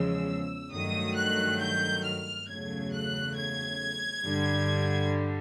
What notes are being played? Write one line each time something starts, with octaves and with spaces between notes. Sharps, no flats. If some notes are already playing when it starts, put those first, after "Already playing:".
Already playing: E2 C#3 F3 G#3 E6
G2 D#3 F#3 A3 D#6
F#6
G6
F6
E2 C#3 F#3 A3 G#6
F#6
G#6
G2 D3 G3